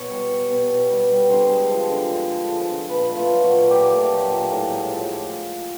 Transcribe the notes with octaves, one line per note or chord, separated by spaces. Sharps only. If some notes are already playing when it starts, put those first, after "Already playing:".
Already playing: B2 C#5
G3
G3
B2
B2
G3
G3
D3 C5
G#3
F3
D3
D3
G#3
F3
D3
A#2 B4
A3
F4
F#3
F#4
A#2
A#2 G4
A3
F#3
A#2
A2
G#3
F3